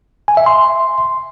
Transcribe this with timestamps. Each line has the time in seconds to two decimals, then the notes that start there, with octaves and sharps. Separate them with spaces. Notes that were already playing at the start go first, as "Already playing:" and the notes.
0.28 G#5
0.37 E5
0.46 C6